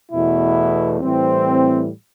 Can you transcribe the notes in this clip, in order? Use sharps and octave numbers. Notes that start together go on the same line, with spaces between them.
E2 B2 A3 E4
A2 E3 G3 C4